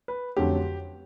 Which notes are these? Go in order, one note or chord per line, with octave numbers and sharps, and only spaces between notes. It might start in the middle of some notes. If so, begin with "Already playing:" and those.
B4
F2 D3 F#3 A3 C#4 G4